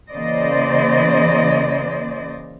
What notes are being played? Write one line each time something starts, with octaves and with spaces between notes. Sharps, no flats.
C#3 E3 A#3 C5 D5 D#5